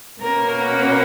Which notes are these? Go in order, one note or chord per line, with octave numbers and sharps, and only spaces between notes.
B2 A#3 C#4 A#4
F#5